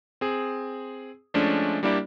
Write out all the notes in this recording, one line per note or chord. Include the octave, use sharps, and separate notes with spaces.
C4 G#4
F3 G#3 A3 C#4 D4
G3 A#3 D4 E4 G4 D5